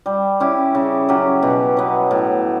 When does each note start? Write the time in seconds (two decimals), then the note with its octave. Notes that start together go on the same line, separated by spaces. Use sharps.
0.06 G3
0.40 C#4 E4 G4
0.75 C#3
1.09 F#3 C#4 G4
1.43 B2
1.77 F#3 B3
2.11 A2